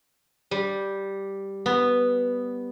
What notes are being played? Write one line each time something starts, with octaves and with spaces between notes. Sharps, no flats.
G3
B3